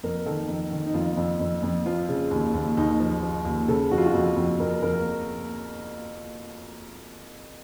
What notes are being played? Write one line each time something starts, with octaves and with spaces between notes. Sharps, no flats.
F2 A#4
D#3 A4
F2
D#3
D#4
F2 F4
F2
F2
F2
F3 F4
C#3
D#2
D#2
D#2 D#4
F3
F3
D#2
C#3 A4
F2 F#4
F4
F#4
F2
F2
F2 A#4
F2 A#4